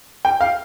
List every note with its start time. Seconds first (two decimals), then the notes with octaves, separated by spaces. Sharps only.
0.25 G5
0.41 F5